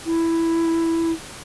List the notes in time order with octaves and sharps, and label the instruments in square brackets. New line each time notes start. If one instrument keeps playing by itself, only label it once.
[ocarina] E4